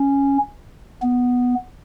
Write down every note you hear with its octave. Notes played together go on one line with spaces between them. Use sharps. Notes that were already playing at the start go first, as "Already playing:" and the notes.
Already playing: C#4
B3